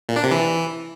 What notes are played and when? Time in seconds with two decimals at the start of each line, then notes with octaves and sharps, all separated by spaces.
0.09 A#2
0.16 D4
0.24 C3
0.31 E3